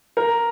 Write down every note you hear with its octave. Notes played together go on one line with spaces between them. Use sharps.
A#4